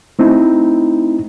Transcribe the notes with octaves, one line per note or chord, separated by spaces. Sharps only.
A3 C4 D#4 E4